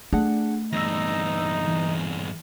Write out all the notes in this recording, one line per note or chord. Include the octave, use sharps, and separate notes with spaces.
A3 D4 G#4 F#5
E2 G2 D#4 E6 A#6
E3